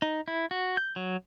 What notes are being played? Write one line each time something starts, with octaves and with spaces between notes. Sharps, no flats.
D#4
E4
F#4
G6
F#3